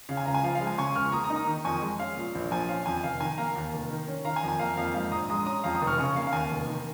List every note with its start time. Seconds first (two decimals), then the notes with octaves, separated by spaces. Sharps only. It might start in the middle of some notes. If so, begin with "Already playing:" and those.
0.09 C#3 F5
0.17 G#5
0.26 C#2 F5 A#5
0.34 G#5
0.43 F3 F5
0.55 F5
0.61 G#3
0.67 G#5
0.78 C#3 G#5 C#6
0.95 C#2 C#6 F6
1.12 A#3 A#5 D#6
1.24 A#5 D#6
1.30 D#4
1.36 A#5 D#6
1.47 D#3
1.64 F2 G#5 C#6
1.82 G#3
1.99 C#4 F5
2.17 A#2
2.35 A#1
2.51 F3 G#5
2.69 C#4 F5
2.86 F2 G#5
3.04 F1 F5
3.20 D#3 G#5
3.38 A#3 F5 A#5
3.55 D#2
3.74 F1
3.90 D#3
4.08 C#4
4.25 D#3 F5 A#5
4.36 G#5
4.43 F2
4.48 G#5
4.59 A#3 F5 A#5
4.77 F2 F5
4.94 G#2 F5
5.11 A#1 A#5 D#6
5.29 G#3 A#5 D#6
5.46 C#4 A#5 D#6
5.64 F2 F5 A#5
5.75 A#5 D#6
5.82 F1
5.87 C#6 F6
5.98 C#3 G#5 C#6
6.16 A#3 F5
6.27 F5
6.33 D#2 G#5
6.51 F1
6.67 D#3